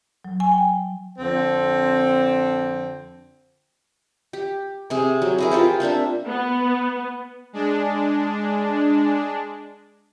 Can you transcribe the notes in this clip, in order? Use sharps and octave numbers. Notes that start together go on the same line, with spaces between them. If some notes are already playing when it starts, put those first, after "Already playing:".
F#3
G#5
G5
F2 D3 C4
G4
C3 C4 G#4
F#3
E4 G#4 A#4
F4 G4 C5
A#3 C4 D4 E5
B3
G#3 D4